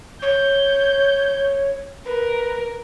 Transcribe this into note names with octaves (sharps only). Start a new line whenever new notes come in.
C#5 G6
A#4 B4